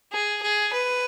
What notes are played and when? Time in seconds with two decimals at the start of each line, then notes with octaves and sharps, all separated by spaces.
0.12 G#4
0.42 G#4
0.73 B4